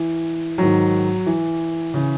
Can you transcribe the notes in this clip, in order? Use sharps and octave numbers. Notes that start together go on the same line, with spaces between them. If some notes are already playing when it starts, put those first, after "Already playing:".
Already playing: E3
G#2 D#3 F#3
E3
C#3 E3